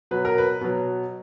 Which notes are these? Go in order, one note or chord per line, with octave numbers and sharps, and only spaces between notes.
B2 F#3 B4
A#4
B4
B2 F#3